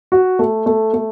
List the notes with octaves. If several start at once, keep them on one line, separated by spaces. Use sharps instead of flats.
F#4
A3
A3
A3